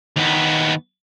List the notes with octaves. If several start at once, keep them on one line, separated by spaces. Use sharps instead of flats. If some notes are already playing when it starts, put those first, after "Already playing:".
D#2 B3